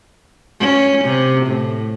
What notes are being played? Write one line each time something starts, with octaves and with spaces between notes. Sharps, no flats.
C#4
C3
A2